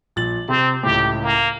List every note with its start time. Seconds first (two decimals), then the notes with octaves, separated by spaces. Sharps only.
0.16 A#1 A6 F#7
0.49 C3 C4
0.83 C#2 A2 G4
1.23 A#3